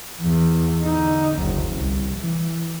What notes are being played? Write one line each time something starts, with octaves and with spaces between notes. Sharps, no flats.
E2
D3 D#4
F#1 D2
C2
E3